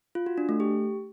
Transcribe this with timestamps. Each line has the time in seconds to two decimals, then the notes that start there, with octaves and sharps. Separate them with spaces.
0.15 F4
0.26 F#4
0.38 D4
0.49 A3
0.60 G4